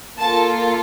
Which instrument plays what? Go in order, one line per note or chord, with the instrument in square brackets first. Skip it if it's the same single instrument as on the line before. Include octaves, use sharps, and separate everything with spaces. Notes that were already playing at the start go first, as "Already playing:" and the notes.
[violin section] A#3 F4 A4 A5